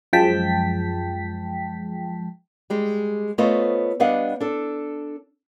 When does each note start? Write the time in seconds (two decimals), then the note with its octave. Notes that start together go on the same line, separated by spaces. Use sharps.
0.13 F#2 F3 G#3 G5 A5 B6
2.70 G3 G#3 G4
3.38 A3 B3 F4 C5 C#5 D#5
4.00 G3 B3 D4 D#5 F5 F#5
4.41 D4 A4